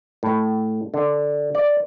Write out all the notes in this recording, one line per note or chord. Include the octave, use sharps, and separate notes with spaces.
A2
D3
D5